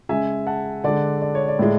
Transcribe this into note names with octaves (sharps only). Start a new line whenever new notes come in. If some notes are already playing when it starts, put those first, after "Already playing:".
C#3 G#3 E5 G#5
F#5 A5
D3 G#3 D5 F#5
D5
C#5
D5
A2 G#3